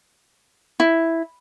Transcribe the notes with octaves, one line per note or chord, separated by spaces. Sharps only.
E4